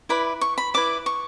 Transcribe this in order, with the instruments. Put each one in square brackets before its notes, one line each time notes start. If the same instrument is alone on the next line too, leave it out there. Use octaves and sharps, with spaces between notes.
[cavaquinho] E4 B4 D5 B5
C#6
B5
E4 B4 D5 D6
C#6